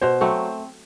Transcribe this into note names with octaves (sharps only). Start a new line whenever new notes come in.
B2 C5
F#3 A3 C4